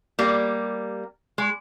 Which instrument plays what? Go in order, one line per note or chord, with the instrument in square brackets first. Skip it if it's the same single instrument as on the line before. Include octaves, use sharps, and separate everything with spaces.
[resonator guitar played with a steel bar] G3 A#3
G#3